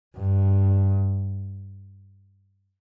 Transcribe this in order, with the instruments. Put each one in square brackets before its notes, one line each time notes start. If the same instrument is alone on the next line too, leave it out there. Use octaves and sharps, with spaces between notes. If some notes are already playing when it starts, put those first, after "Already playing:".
[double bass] G2